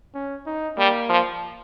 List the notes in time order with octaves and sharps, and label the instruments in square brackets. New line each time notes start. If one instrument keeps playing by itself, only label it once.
[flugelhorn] C#4
D#4
[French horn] G3 [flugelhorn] A#3
[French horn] F3